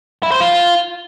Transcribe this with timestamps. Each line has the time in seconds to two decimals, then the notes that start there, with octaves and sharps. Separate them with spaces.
0.23 E4
0.32 C5
0.40 F4